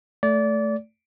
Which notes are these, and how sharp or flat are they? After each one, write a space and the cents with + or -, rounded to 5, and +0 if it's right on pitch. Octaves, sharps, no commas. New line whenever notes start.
A3 -5 D5 -25